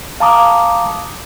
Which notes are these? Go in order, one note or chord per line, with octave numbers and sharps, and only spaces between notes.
F5 A5 A#5 D6 D#6